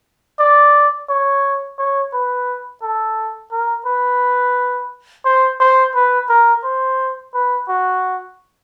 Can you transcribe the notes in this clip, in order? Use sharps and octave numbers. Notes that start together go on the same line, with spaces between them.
D5
C#5
C#5
B4
A4
A#4
B4
C5
C5
B4
A#4
C5
B4
F#4